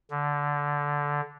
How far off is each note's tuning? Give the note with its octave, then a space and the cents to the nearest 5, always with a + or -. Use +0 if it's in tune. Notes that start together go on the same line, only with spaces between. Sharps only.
D3 -10